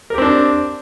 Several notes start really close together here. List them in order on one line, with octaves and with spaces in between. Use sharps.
A#4 G4 C4 D4